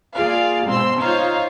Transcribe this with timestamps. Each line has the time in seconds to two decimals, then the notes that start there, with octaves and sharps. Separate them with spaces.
0.14 A#3 F4 G#4 D5 F5
0.67 G#2 B2 C4 C6 E6
0.99 D#4 F4 C5 C#5 F5